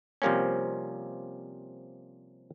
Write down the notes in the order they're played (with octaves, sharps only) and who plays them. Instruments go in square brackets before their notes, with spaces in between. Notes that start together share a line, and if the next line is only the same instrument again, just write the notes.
[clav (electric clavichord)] C3 F3 G3 A#3 C4 C#4